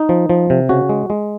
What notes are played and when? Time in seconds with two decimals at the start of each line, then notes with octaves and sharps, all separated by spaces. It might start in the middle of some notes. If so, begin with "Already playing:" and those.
Already playing: D#4
0.09 F3
0.30 F3
0.50 C3
0.69 C#3 F#4
0.89 G#3
1.10 G#3